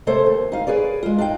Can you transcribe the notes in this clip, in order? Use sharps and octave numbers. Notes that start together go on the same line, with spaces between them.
C3 A3 A4 C5 C#5
D#2
D#4 F5
G#4 B4 C#5 D5
G#3 F4
D4 D#4 F5 G5